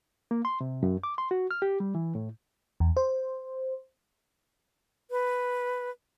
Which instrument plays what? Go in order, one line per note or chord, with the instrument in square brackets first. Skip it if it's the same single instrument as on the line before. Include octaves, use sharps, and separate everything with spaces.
[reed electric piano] A#3
C6
C3
F#2
D6
C6
F#4
F6
G4
G3
E3
A2
[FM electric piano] E2
C5
[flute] B4